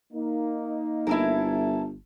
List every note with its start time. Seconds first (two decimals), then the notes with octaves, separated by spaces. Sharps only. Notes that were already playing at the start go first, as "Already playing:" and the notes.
0.13 A#3 D#4
1.07 G1 E4 A4 A#4